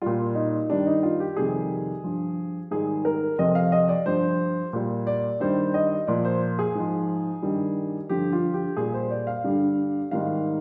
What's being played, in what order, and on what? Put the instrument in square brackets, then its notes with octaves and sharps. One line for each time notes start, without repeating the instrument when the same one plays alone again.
[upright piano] A#2 G3 F4
D#4
G2 D#3 G3 D4
D#4
F4
G4
F2 C3 D#3 G3 G#4
G2 F3
G#2 D#3 G3 G#4
A#4
F2 C3 F3 D#5
F5
D#5
D5
G2 F3 C5
A#2 G3
D5
G2 D#3 G3 C5
D#5
A#2 F3 D5
C5
G#4
G#2 F3
G2 D#3 G3
G2 D3 F3 G4
F4
G4
A#2 G3 G#4
C5
D5
F5
G2 D3 G3
G#2 D#3 G3 F5